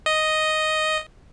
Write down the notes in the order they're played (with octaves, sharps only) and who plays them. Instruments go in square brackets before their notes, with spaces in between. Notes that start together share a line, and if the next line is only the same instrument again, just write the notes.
[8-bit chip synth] D#5